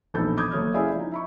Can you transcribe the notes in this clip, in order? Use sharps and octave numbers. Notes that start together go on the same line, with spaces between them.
E1 A#1 D#3 A4 B5 G6
B5 D6 D#6 G6 G#6
F#1 A4 C#5 D#6 F6
C#4 E4 G#4 D5 E5 F5
F3 D#4
E5 B5 C#6